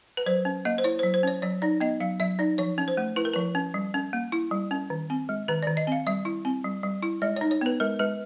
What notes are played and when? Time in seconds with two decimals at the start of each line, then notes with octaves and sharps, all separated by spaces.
0.17 B4
0.26 F#3 C5
0.45 C#4
0.65 A#3 D#5
0.78 C5
0.84 E4 C#5
0.99 F#3 C5
1.14 C5
1.23 C#4 C#5
1.42 F#3 C#5
1.62 D#4 D5
1.81 B3 D#5
2.00 F#3 F5
2.20 F#3 E5
2.39 D#4 D5
2.58 F3 C#5
2.78 C#4
2.88 C5
2.97 A3
3.16 E4 B4
3.25 A#4
3.34 F3 B4
3.55 C#4
3.74 G3
3.94 C#4
4.13 A#3
4.32 E4
4.51 G3
4.71 C#4
4.90 D#3
5.10 C4
5.29 G#3
5.48 D#3 B4
5.63 D#3 D5
5.77 D#5
5.87 C4 F5
6.07 G3 E5
6.25 E4
6.45 C4
6.64 G3
6.83 G3
7.02 E4
7.22 G#3 D5
7.36 D#4 C#5
7.51 C#5
7.61 B3 B4
7.80 G#3 A#4
7.99 G#3 B4